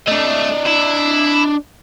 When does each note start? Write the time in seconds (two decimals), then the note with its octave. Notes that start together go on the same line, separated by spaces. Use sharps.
0.08 A3 D4 D#5
0.66 E4